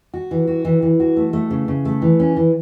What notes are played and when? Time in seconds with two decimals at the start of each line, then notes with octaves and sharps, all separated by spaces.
0.14 F#4
0.31 E3
0.47 F#4
0.65 E3
0.82 E3
1.00 F#4
1.17 A3
1.33 A3
1.51 C#3
1.68 C#3
1.85 A3
2.02 E3
2.20 C#4
2.37 E3